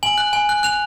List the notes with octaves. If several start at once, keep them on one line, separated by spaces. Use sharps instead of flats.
G#5 F#7
F#6
G#5
F#6
F#6 F7